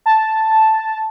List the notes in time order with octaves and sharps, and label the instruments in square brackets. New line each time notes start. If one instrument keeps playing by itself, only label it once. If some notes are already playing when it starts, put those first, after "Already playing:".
[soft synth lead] A5